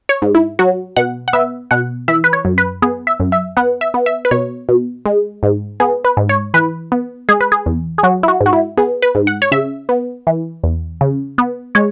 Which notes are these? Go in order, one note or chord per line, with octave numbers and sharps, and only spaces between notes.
C#5
G#2
E4
F#3 F#4
B2 F#5
F#5
B3 E5
B2 F#5
E3 E5
B4
C#5
F#2
B4
B3 G#4
E5
F#2
E5
B3 F#5
E5
B3
E5
B4
B2 C#5
B2
G#3
G#2
B3 G#4
B4
G#2
C#5
E3 B4
B3
G#3 G#4
B4
G#4
E2
G#4
F#3 F#4
E4
F#4
G#2
F#4
E4
B3 G#4
B4
G#2
F#5
C#5
C#3 E5
B3
E3
E2
C#3
B3
G#3 C#5